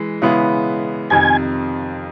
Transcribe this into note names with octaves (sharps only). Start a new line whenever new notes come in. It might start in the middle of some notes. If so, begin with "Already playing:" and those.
Already playing: E3 G#3
C#3 E3 G#3 B3 E4
F2 C3 D#3 G#5